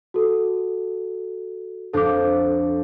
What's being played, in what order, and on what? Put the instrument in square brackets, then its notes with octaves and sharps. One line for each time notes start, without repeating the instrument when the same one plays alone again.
[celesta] F#4 A4
[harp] F2 D4 C5 [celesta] A4 D6